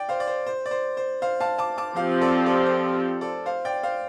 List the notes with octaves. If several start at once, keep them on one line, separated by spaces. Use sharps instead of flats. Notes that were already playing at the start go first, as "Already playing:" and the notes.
Already playing: D5 G5
C5 F5
D5
C5
C5
D5
C5
C5
C5 F5
F5 A5
A5 D6
A5 D6
F3 C4 G4 C5 F5
A4 D5
A4 D5
C5
A4
C5
A4 D5
C5 F5
D5 G5
C5 F5